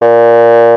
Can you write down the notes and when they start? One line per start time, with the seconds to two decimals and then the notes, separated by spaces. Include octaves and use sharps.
0.01 A#2